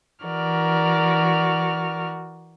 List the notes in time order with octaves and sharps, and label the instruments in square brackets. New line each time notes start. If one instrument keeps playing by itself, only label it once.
[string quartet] E3 F#4 A#4 D5 F6